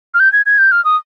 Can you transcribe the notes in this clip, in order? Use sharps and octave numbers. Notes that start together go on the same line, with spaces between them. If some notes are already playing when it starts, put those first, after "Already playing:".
F6
G6
G#6
G#6
G6
F6
D#6